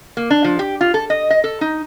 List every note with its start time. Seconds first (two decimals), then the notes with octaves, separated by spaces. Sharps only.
0.17 A#3
0.30 D4
0.44 F3
0.59 G4
0.81 F4
0.94 A4
1.10 D#5
1.30 D#5
1.44 A4
1.61 D#4